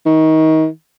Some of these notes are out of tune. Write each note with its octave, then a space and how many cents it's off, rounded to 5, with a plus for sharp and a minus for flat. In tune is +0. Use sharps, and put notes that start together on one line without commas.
D#3 +25